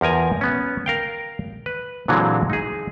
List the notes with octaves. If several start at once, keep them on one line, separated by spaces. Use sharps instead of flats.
E2 F3 A#4 G#5 A#5
B3 C#4
A#4 F5 G5
B4
A#2 D3 E3 F#3 G#3 C4
D#4 G#4